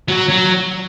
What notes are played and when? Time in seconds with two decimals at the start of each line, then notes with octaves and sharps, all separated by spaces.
0.08 F#3
0.29 F#3